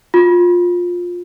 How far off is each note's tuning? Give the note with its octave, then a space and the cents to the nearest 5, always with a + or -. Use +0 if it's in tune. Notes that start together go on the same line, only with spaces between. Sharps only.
F4 +15